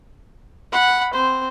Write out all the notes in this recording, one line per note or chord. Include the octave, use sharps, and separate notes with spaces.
F#5 B5
C4 C5